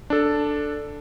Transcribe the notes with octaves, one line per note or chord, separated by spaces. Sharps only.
D4 A4